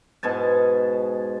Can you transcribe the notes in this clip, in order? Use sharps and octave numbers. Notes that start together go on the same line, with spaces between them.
G#2 B2 G#5 A5